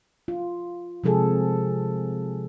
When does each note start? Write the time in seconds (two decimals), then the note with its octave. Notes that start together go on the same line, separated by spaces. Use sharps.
0.28 F4
1.04 C3 F3 G#3 G#4 A4